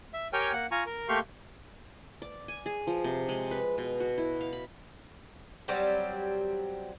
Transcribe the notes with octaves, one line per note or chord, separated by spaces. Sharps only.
E5
G4 A#4 C#5 G5 G#5 F6
A#3 F#5
F4 G#5 A#5 C#6
A#4
A3 A#3 G4 C6 C#6 F6
D5
G#5
G#4
F3
C3
G#3
B4
B2
F#4
E4
F5
B5
F#3 G3 C4 G4